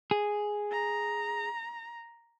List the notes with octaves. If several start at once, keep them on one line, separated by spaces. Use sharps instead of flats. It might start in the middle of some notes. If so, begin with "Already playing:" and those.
G#4
A#5